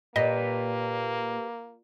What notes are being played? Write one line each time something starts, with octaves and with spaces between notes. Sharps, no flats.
A#2 A#3 G4 B4 D#5